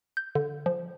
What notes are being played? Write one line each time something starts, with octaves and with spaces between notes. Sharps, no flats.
G6
D3
F3